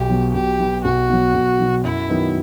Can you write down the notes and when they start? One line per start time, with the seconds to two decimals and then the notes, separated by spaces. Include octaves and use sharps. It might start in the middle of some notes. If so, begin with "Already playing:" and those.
Already playing: B1 G4
0.10 B2 F#3
0.34 B1 G4
0.59 B2 F#3
0.84 B1 F#4
1.10 B2 F#3
1.34 B1
1.59 B2 F#3
1.84 F#2 E4
2.09 D#3 F#3 B3 D#4